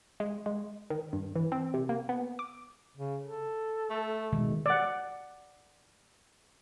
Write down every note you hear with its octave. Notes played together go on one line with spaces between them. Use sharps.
G#3
G#3
D#3
G2
E3
C4
C3
A#3
B3
D6
C#3
A4
A3
B2 D#3 G#3
D5 F#5